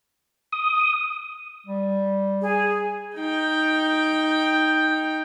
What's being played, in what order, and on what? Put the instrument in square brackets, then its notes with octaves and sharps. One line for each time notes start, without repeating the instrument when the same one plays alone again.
[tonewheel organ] D#6
[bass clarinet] G3
[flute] G#4
[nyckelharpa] D#4 G5